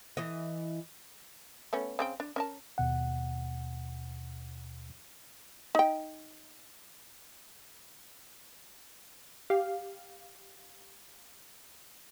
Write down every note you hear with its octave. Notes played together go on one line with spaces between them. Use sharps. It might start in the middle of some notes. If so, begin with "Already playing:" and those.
E3 D#5
A3 B3 C#4
C#3 C4 G5
D4
C#4 A#4 A5
D#2 B2 F#5
D#4 G5
G4 F5